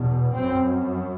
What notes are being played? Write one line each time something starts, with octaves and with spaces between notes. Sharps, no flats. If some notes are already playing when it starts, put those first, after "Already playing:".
Already playing: E2 B2
F#2 C4